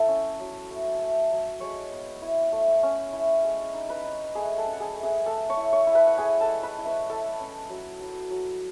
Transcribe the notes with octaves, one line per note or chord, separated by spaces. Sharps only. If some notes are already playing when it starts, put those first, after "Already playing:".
Already playing: E4 A4
C#4
F#3
A3
A3
F#3
G#3 C#5 C#6
B3
E4
A3
C#4
E4
G#3
D#4
B4 B5
D#4
A3 G#4 G#5
A4 A5
C#4
F#5
G#4 G#5
A3
G#4 G#5
A3 A4 A5
C#5 C#6
E4
C#5 C#6
E4
B4 B5
F#5
E4 G#4 G#5
A4 A5
G#3
B4 B5
E4
B4 B5
E4 A4 A5
C#4
F#3
F#3
F#3